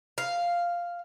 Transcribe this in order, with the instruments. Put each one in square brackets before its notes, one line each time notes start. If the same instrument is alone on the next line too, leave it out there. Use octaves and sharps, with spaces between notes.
[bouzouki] F5